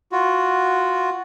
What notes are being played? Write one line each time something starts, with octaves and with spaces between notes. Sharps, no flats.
F4 F#4